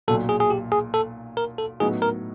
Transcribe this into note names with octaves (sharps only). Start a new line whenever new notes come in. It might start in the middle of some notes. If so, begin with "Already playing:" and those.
B1 A#2 F#3 A4
G#4
G#4
G4
G#4
A4
A#4
A4
A2 F#3 B3 D#4 G#4
A#4